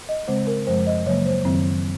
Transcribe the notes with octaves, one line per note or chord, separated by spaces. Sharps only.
D#5
C#3 G#3 C4 C5
A#4
F#2 F3 G#3 C5
D#5
C#3 F#3 A#3 C#5
C5
F#2 D#3 F#3 C4